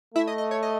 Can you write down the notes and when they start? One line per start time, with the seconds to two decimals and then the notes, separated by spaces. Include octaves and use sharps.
0.14 A3 E4 E5
0.27 D#5
0.38 D#5
0.51 C#5
0.63 D#5